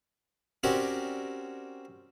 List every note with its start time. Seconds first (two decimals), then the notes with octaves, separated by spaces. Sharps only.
0.63 C4 C#4 F#4 G4 A#4 D5